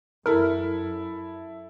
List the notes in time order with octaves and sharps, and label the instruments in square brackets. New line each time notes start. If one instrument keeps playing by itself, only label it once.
[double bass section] F#2 [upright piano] E4 A4 [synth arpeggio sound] A#4